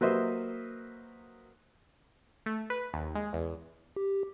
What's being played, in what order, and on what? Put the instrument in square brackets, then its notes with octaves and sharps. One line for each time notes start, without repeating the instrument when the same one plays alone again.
[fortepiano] F#3 A#3 B4 C5 D#5 E5
[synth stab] A3
B4
D#2
G#3
E2
[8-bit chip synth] G4